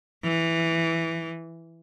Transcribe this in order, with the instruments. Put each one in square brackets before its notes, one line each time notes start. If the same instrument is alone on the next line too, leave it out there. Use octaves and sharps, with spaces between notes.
[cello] E3